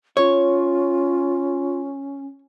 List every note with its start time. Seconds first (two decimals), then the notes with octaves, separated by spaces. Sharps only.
0.17 C#4 F4 C#5